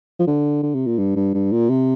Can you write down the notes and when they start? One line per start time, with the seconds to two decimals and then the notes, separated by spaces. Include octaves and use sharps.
0.19 F3
0.27 D3
0.63 D3
0.74 C3
0.87 A#2
0.98 G2
1.16 G2
1.34 G2
1.52 A#2
1.70 C3